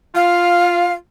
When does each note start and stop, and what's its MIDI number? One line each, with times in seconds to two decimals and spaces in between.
0.15 0.95 65
0.15 0.93 77